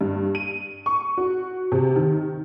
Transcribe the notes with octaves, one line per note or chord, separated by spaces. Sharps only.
G2
D#7
C#6
F#4
C3
D#3